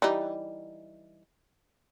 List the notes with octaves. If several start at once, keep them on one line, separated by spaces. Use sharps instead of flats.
E3 G3 D#4